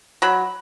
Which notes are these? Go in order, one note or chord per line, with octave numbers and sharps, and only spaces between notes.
F#3 B5